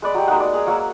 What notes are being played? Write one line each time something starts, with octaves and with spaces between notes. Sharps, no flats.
G#3 B4 D5
F#3 G4
G#3 A#3 D#4 F#5
D5
G#4 G#5 A#5
F#3 A#3 C#5 E6